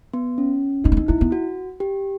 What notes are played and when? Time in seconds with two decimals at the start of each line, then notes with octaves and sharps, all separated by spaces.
0.14 B3
0.38 C#4
0.84 C4 D#4
0.92 B3
0.97 C4
1.08 B3 E4
1.21 B3
1.32 F#4
1.80 G4